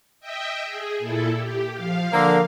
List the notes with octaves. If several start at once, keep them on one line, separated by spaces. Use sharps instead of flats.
D#5 E5 G5
G#4
A#2 E4 A4
G4
F3 F5
D3 A#3